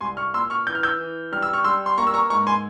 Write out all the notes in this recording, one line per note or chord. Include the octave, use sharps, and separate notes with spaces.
C2 G#5 C6
C#6 F6
A#2 C6 E6
C#6 F6
E3 G6
F6
E6 G6
E3
G3 F6
E6
C#6 F6
G3 C6 E6
C6
A#3 A#5 C#6
E6
A#5 C#6
G#2 A#5 C#6
G#5 C6